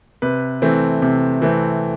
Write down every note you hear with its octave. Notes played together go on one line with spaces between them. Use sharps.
C3 B4
E3 A3 C4
C3
E3 A3 C4